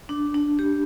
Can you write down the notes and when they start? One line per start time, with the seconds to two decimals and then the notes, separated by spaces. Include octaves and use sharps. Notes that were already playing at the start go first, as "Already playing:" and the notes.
0.09 D4
0.34 D4
0.59 G4